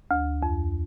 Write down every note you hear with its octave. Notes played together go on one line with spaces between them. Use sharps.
D2
F2